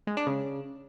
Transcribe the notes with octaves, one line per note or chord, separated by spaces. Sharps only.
G#3
D4
C#3